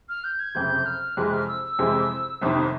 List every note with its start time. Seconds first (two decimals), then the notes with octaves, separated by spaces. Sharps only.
0.09 F6
0.24 G6
0.39 G#6
0.55 F#1 F2 C3 G6
0.86 F6
1.17 F2 C3 E3 G#3 F#6
1.28 F#6
1.33 F6
1.48 E6
1.65 E6
1.79 F2 C3 E3 G#3
2.42 G1 F2 C3 D#3 D#6